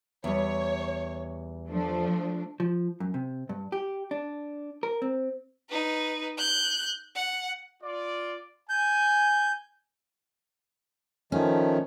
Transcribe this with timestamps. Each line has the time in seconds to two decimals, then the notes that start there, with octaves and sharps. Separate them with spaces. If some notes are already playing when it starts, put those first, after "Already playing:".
0.24 E2 G3 C#5
1.69 F3 A3 D4
2.60 F3
3.00 F#2
3.14 C3
3.49 G2
3.72 G4
4.11 D4
4.83 A#4
5.02 C4
5.69 D#4 B4
6.38 F#6 G6
7.15 F#5
7.83 F4 D5
8.69 G#5 G6
11.32 D#3 F3 A3 C#4